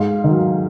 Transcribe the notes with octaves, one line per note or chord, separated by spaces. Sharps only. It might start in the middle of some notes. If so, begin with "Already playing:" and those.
Already playing: G#2 F5
D#3 F#3